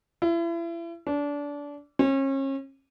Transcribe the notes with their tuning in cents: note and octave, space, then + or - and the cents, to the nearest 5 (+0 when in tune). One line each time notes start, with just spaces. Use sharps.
E4 +35
D4 -25
C#4 -35